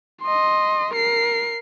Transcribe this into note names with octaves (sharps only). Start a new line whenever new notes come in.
D#5 C6
A#4 C7